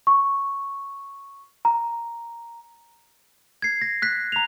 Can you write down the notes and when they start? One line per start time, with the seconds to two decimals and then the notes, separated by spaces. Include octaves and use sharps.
0.07 C#6
1.65 A#5
3.62 G#6 C7
3.82 A#6
4.02 F#6 B6
4.32 A#5 F7